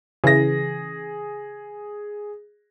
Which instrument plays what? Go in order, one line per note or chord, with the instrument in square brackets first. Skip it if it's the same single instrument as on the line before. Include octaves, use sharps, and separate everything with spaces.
[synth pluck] C#3 E3 [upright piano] G#4 A#6